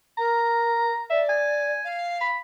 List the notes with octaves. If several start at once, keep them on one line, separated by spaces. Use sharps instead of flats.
A#4 A#5
D5 E5
G#5
F5
B5